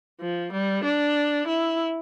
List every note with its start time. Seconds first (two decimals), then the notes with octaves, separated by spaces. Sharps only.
0.20 F3
0.53 G3
0.84 D4
1.47 E4